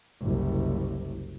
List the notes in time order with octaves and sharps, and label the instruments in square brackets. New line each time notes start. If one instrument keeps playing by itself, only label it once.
[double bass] F#1 C2